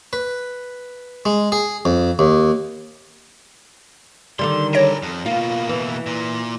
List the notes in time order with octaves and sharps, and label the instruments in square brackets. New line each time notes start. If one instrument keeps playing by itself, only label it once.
[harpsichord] B4
G#3
G#4
F2
D#2
[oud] D3 D#3 G3 [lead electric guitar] C6
[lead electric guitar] G#4 A#4 [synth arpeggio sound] C#5 A#6 D7
[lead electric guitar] F2
[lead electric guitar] B2 A#3 [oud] F4
[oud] E3
[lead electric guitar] A#2